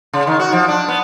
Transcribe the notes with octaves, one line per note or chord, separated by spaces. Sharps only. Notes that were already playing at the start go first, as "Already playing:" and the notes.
C#3
D#3
F#4
F3
D4
B3